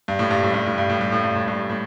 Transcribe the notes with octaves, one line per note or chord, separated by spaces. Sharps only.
G2
A2
G2
A2
G2
A2
G2
A2
G2
A2
G2
A2
G2
A2